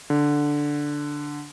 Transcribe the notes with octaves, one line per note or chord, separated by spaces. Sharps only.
D3